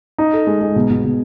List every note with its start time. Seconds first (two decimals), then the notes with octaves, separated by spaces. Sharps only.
0.18 D#4
0.33 A4
0.47 G#3
0.61 G#3
0.76 B2
0.90 B2
1.03 B2